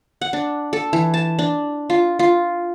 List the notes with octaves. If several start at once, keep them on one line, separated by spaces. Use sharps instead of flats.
F#5
D4
A4
E3
A5
D4
F4
F4